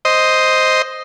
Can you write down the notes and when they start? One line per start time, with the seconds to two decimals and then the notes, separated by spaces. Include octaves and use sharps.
0.05 C5 D#5